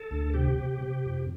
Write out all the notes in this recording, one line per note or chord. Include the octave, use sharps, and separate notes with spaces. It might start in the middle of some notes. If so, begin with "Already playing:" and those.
Already playing: A4
D2
C3 G4
C3
C3
F2